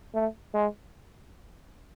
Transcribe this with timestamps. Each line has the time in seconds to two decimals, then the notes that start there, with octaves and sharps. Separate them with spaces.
0.15 A3
0.54 G#3